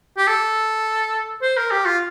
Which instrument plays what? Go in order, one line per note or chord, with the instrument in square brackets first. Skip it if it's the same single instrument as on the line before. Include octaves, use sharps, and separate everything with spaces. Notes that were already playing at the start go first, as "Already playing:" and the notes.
[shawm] G4
A4
C5
A#4
G4
F4